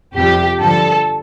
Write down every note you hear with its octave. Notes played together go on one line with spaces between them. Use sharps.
F2 C3 G3 G4
G2 D3 F3 A4